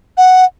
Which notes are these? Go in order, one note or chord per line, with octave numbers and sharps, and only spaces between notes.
F#5